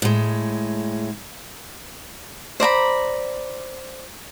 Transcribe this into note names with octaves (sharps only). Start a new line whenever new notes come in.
A2 G#3
C5 D5 A#5 B5